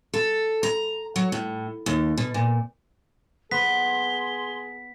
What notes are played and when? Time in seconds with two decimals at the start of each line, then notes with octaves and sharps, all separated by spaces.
0.14 A4
0.63 A#5
1.16 F#3
1.32 A2
1.86 D#2
2.17 B2
2.34 A#2
3.51 B3 G#4 C6 B6